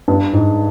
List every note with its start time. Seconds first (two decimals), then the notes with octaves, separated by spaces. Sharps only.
0.08 G2
0.33 G#2